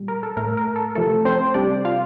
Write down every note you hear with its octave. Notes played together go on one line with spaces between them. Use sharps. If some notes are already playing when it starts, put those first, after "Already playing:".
Already playing: A#2 G3
A#4
A4
A2 A3 A#4
A#4
A4
C3 F3 A3 A4
C4 C5
C3 G3 D4 D5
F4 F5